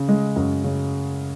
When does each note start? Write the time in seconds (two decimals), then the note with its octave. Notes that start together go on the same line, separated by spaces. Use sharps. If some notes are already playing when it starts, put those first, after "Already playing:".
Already playing: C#3
0.09 G#3
0.36 F#2
0.64 C#3